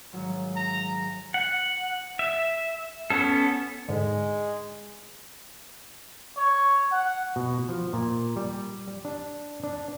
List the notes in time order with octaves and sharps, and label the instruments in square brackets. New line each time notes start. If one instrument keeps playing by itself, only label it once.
[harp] G#1 F#3
[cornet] A#5
[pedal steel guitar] F#5
E5
B3 C#4 A4
[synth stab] G#2 D3 [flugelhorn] G#3
[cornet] C#5
F#5
[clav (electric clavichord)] B2
F3
A#2
G3
D4
D4